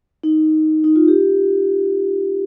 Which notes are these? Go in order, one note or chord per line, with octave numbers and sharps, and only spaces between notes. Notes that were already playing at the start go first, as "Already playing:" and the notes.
D#4
D#4
F4
G4